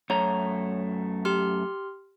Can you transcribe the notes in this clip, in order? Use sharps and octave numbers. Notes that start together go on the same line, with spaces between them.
F#2 A3 C#5 A#5
G4 C6 F6